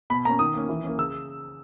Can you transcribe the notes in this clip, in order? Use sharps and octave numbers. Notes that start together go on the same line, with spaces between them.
B2 B5
A#3 C#4 A#5
D#3 D#6
A#3 C#4
E3
A#3 C#4
C#3 E6